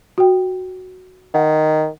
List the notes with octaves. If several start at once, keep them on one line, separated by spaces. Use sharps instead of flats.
F#4 G5
D#3 F#5